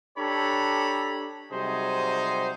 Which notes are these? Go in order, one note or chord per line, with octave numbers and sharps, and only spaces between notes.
D4 G4 A4 C#5 A#5 B5
C3 F#3 G3 D#4 G#4 C5